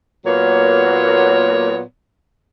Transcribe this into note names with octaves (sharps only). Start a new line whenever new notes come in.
A#2 F#3 A#3 B3 C#5